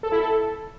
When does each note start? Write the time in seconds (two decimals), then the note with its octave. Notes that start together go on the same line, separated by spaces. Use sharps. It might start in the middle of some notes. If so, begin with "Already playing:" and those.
0.03 A4
0.12 E4
0.21 A4